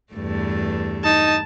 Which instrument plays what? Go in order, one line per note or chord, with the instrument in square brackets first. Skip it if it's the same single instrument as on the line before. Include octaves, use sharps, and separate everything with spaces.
[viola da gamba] E2 G2 A3
[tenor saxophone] D#4 [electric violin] A5